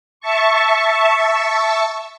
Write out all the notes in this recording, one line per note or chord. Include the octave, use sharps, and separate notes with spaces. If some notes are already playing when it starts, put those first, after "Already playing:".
E5 A5 C#6